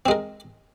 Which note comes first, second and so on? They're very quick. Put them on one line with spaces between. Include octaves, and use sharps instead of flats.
C4 G#3 A#4